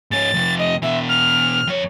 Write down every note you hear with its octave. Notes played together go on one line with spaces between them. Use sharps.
G#2 C#4 A6
F2 C3
D#5
B2 E3 E5
F6
F2 C#5